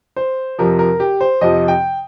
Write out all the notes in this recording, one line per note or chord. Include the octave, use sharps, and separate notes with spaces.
C5
F2 C3 F3 A#4
A#4
G4
C5
F2 C3 F3 D#5
G5